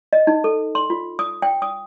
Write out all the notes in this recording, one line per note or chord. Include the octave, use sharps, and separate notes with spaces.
D#5
D#4
A4
C6
F4
D#6
G5
D#6